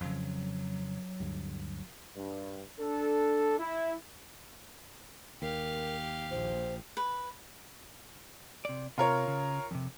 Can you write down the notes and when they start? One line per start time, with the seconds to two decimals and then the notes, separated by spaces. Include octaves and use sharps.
0.01 F2 C#3 F#3
1.20 D2 G2
2.16 G2
2.80 D4 A4
3.59 E4
5.42 D#2 G4 A#4 F5
6.31 A#1 C5
6.97 B4
8.65 C3 D5
8.98 C3 F4 A#4 C#5
9.28 C#3
9.71 F2 C3